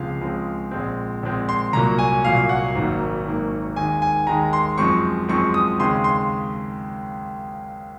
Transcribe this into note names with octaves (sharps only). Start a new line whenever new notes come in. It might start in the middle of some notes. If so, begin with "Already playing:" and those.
Already playing: C#2 C#3 F3 G#3 C4 F5
C#2 C#3 F3 G#3 C4
A#1 A#2 G#3 C4
A#1 A#2 G#3 C4
C6
C2 A#2 F#3 A#3 A#5
G#5
C2 A#2 F#3 A#3 F5
F#5
G#1 G#2 F#3 A#3
G#1 G#2 F#3 A#3
D#2 D#3 G#3 G#5
G#5
D#2 D#3 G#3 A#5
C6
F#2 F3 G#3 C4 C#6
F#2 F3 G#3 C4 C#6
D#6
D#2 C#3 G#3 C4 C6
C6